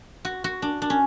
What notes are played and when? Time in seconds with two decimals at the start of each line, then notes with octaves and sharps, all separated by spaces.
0.25 F#4
0.44 F#4
0.62 D4
0.82 D4
0.90 C#4